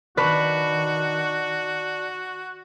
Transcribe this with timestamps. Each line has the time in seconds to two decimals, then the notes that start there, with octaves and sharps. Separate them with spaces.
0.17 D#3 F#4 B4 D5 A5 C#6 F#6